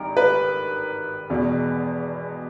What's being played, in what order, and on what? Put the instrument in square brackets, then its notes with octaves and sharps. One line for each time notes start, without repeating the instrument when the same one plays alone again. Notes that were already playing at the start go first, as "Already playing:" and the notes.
Already playing: [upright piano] G#1 G2 D#3 A#4
B4
E1 E2 B2